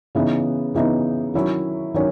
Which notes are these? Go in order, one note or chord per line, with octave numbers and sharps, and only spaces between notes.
C#3 E3 B3 D#4
C#3 E3 B3 D#4
D#3 F#3 C#4 E4
D#3 F#3 C#4